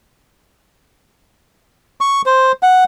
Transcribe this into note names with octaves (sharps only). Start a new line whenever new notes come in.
C#6
C5
F#5